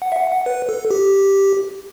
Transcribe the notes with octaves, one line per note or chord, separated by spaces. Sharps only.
F#5
E5
F#5
F#5
B4
A4
G4